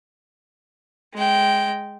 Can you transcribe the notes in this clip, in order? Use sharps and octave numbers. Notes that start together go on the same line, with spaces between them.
G#3 G5